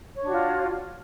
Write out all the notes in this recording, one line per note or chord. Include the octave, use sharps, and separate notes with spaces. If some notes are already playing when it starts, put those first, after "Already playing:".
D4 F4 F#4 C#5